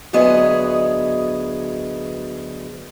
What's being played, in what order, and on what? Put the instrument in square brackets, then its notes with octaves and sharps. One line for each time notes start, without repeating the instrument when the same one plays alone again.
[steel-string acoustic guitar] D2 F#3 B3 G#4 D#5